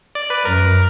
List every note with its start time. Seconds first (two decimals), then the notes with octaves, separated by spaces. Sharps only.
0.15 D5
0.30 B4
0.45 F#2 A#4